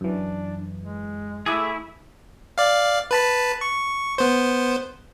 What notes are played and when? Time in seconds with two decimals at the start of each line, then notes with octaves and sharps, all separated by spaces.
0.01 F#2 E3 D4
0.80 G#3
1.46 A3 E4 G#4 D6 E6
2.58 D5 F5
3.11 B4 A5 B5
3.61 C#6
4.18 B3 C5